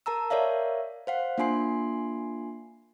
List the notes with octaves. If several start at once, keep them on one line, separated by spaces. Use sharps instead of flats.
A#4 A5 A#5 E6
A#4 C#5 D5 E5 F5
C5 F5 F#5
A#3 D4 F4 G#5 C6 C7